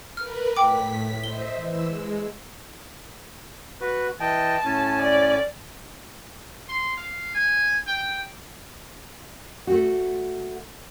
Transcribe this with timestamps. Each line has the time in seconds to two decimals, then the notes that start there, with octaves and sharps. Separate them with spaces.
0.17 A#4 B4 F6
0.57 A2 G5 D6 B6
1.24 C5 D#5 E5 G7
1.55 E3 E6
1.87 G#3
3.81 F#4 B4
4.20 E3 D#5 G5 A5
4.65 A2 C#4 G#5
5.02 D5
6.69 C6
6.97 F5
7.34 G#5
7.87 G5
9.67 A3 F#4